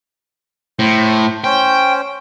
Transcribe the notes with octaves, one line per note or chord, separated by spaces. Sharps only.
A2 C5
C#4 C5 G5